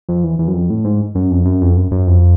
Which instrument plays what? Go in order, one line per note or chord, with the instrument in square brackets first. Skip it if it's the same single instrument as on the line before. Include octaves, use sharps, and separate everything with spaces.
[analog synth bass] F2
E2
E2
F#2
F2
A2
G#2
F#2
F2
F#2
F2
F#2
F#2
F2